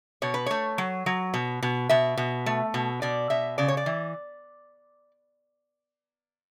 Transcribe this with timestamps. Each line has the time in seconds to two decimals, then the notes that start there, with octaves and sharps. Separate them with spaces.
0.22 B2 C#5
0.34 B4
0.46 A3 C#5
0.78 F#3
1.06 F#3
1.34 B2
1.63 B2
1.89 B2 E5
2.17 B2
2.46 A3
2.74 B2
3.02 B2 D5
3.30 B2 E5
3.58 C#3 D5
3.68 C#5
3.77 D5
3.86 E3